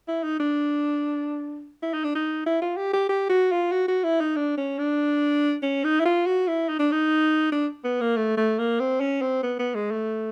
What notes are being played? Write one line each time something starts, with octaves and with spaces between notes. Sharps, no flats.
E4
D#4
D4
E4
D#4
D4
D#4
E4
F4
G4
G4
G4
F#4
F4
F#4
F#4
E4
D#4
D4
C#4
D4
C#4
D#4
E4
F4
F#4
E4
D#4
D4
D#4
D4
B3
A#3
A3
A3
A#3
C4
C#4
C4
B3
B3
G#3
A3